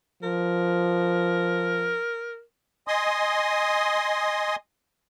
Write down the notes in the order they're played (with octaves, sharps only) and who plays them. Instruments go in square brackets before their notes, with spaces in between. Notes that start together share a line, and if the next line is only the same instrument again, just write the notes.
[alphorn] F3 [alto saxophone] A#4
[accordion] D#5 G#5 C6 D#6